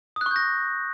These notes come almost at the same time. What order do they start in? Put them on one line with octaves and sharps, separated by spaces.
D#6 F#6 C#6 G6 A#6